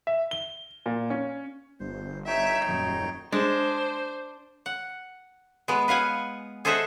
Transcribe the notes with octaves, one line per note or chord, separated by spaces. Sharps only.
E5
G7
A#2
C#4
G1 C5
D#4 C#5 E5 G5
D#1 F#2
G#3 D4 C5
F#5
G#3 B3
B4 F5 F#5 G#5
G#4 A4 C5 D#5 E5 F#5